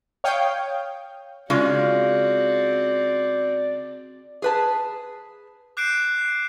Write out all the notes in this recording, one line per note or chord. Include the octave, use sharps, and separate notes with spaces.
C#5 F5 G5 D#6 G6
C#3 G#3 C4 F4 F#4 D5
G#4 B4 A5
D6 F#6 G6 C7 D7 E7